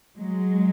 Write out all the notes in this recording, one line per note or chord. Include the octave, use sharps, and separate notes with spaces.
F#3 G#3